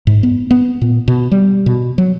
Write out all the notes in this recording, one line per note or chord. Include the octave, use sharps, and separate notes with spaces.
G#2
B3
B3
A#2
B2
G3
B2
F#3